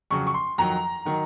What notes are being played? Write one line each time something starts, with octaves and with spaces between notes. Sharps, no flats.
F2 C#3 F#3 C#6
C#6
C6
F2 D#3 F#3 A#5
D#3 F#3